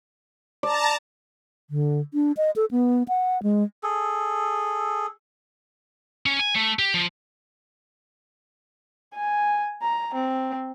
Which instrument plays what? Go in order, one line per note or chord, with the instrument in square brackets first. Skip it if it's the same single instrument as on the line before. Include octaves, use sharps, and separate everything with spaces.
[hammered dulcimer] D5 [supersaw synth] A5 A#5
[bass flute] D3
D4
D#5
A4
B3
F#5
G#3
[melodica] G#4 A4
[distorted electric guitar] C#4
G#5
A3
G4
F3
[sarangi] G#5
A#5
C4